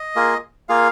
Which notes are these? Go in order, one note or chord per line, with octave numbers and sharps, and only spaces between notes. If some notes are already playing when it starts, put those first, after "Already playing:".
Already playing: D#5
A#3 F4 G#4
A#3 F4 G#4 F5